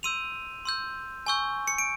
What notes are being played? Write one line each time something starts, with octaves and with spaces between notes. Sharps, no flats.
C6 E6 G6 D#7 F7
C6 E6 G6
G#5 C#6 E6 G6
C#7
D7